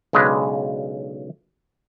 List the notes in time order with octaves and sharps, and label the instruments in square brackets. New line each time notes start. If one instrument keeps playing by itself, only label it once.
[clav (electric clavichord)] B1 C#3 G#3 D4 B4 G#5